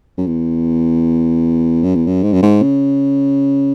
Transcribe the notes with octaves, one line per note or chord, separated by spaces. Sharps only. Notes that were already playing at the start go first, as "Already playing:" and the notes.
F#2
E2
F#2
E2
F#2
G#2
F#2
G#2
C#3